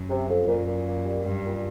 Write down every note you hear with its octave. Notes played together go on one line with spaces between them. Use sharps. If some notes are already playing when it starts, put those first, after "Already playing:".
Already playing: F#2
C3
F2
F#2 A#2
A#2
A#3
G3
G2 G3
A#2